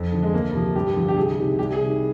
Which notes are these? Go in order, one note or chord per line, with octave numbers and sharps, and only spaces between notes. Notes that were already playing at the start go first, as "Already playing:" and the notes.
Already playing: F2
D3 F3
G#3
D2 A#3
C3 F3
G2 G4
D3 F3
G4
C2 G#4
C3 D#3
C2 G4
G#4
C3 D#3